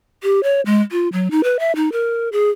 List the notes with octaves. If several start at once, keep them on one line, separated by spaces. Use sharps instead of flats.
G4
C#5
G#3
F4
F#3
D#4
B4
E5
D#4
A#4
G#4